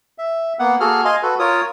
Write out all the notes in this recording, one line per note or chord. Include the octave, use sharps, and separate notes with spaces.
E5
A#3 B3 F#5
A#3 F#4 G#4 A4 F6
D#5 F5 G#5 C6
F#4 A4 B4
F4 A#4 C#5 D#6